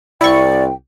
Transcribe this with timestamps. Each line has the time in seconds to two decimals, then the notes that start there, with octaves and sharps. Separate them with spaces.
0.21 C2 E4 D5 G5 C#6